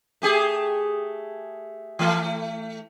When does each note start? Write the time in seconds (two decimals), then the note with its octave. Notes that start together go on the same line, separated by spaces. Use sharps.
0.22 A3 G4 G#4
1.99 E3 A3